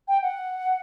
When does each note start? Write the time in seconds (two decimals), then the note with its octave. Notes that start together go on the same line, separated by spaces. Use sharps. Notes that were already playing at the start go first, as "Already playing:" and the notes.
0.08 G5
0.22 F#5